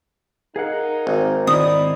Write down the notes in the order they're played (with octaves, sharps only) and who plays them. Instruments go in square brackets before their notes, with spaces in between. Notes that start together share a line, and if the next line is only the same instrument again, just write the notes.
[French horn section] D#4 A#4 [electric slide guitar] G#4 F5 F#5
[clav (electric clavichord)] G#1
[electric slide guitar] G#2 D#3 C4 [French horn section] D#4 E4 D5 [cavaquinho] D#6